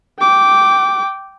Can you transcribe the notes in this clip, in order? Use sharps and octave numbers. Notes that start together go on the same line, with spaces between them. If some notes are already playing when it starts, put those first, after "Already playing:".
G5 D6